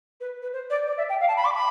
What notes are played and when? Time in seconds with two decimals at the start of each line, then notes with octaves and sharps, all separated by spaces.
0.21 B4
0.42 B4
0.53 C5
0.70 D5
0.87 D5
0.98 E5
1.09 G5
1.21 F5
1.28 A5
1.37 B5
1.45 D6
1.54 B5